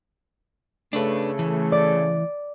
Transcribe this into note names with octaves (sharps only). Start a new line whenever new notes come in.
C#3 A3 D4 B4
E3
D5